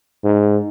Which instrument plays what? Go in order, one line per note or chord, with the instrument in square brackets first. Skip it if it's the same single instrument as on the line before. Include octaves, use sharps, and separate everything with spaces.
[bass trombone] G#2